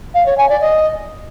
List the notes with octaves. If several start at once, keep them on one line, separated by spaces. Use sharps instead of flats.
F5
C#5
G#5
D5
D#5